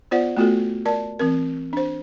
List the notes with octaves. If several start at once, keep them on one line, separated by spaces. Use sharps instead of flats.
B3 F4 C5 D5 F#5
A3 B3 F4 F#4 A4
A#4 D5 A5
E3 C4 A#4
D4 C5